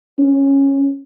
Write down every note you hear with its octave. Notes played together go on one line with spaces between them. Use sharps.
C#4